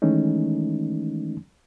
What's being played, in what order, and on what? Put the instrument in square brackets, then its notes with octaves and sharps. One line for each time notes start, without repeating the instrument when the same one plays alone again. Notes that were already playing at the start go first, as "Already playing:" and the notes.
[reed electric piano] D#3 E3 G#3 A3 C#4 D#4